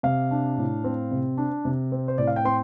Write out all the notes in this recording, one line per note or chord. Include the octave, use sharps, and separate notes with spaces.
C3 F5
D4
A2
C4
C3
D4
C3
C4
C5
A2 D5
F5
G5
C4 C6